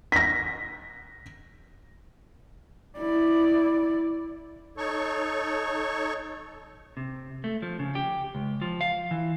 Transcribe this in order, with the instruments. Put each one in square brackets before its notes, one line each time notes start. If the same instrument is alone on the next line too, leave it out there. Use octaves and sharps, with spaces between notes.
[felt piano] A#6 B6
[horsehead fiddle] E4 D5
[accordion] D#4 A4 C#5 C#6
[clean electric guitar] C3
A3
F3
C#3
G4
C#2
F3
F5
E3